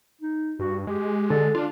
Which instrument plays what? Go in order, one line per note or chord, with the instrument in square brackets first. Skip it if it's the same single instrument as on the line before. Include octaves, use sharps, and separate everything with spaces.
[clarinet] D#4
[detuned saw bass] G2 [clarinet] F#4
[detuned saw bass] G#3 [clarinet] G4
[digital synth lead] D3 [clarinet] A4
[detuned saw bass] D4 [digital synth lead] F4